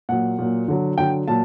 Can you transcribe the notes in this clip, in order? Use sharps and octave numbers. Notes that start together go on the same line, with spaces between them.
A#2 F#3 F#5
A#2 F#3
D3 F#3
D3 F#3 G5
A#2 F#3 A5